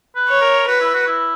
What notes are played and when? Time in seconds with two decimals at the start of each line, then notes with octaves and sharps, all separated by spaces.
0.16 B4
0.28 C#5
0.41 A#4
0.67 F#4 B4
0.81 E4
0.94 F#4
1.07 E4